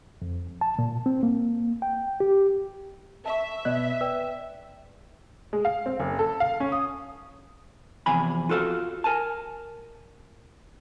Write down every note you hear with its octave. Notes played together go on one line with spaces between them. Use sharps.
F2
A5
A#2
C4
A#3
G5
G4
E5 A5 C#6
B2 B3 D5 D#5 F#6
B4 D5 G5 E6
G#3
F5
C4
F#1
A4
F5
C#4
D#6
E2 C3 F3 G#5 B5
F4 F#4 A4 C#5 F5
A#4 G#5 A5